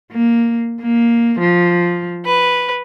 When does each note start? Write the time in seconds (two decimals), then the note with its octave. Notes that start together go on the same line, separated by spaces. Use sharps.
0.13 A#3
0.81 A#3
1.41 F3
2.25 B4